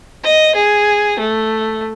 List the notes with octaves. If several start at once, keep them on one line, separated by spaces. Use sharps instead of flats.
D#5
G#4
A3